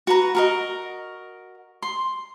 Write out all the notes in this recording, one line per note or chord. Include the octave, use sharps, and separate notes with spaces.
F#4 B4 A#5
F#4 A#4 D#5
C6